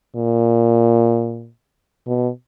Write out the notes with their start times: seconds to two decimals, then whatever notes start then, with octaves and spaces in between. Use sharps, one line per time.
0.15 A#2
2.07 B2